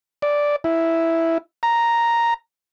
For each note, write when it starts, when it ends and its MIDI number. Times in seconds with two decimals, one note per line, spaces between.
0.22 0.56 74
0.64 1.38 64
1.63 2.34 82